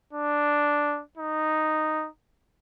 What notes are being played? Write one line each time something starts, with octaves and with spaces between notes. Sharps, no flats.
D4
D#4